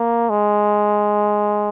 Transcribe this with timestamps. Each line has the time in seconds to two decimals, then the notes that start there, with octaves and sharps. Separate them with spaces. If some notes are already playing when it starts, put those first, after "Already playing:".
Already playing: A#3
0.30 G#3